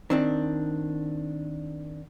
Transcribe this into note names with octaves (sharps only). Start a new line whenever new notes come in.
D#3 C4 D4